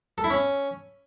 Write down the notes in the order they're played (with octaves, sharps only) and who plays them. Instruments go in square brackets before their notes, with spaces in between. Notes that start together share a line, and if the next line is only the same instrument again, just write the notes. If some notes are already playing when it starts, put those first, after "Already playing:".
[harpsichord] A4
E4
C#4